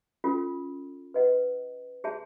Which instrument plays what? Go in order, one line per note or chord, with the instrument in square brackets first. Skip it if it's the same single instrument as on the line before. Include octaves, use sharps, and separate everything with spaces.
[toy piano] C#4 F4 A4
B4 D#5 F#5
G#4 C#5 E5 A5